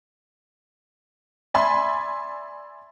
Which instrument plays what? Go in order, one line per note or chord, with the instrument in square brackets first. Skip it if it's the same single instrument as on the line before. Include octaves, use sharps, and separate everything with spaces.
[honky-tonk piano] D5 E5 G#5 B5 C6